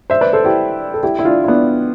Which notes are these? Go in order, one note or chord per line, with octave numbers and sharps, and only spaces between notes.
C5 E5
B4 D5
A4 C5
E4 G4
A4
E4 G4
E4
D4 F4
E4
B3 D4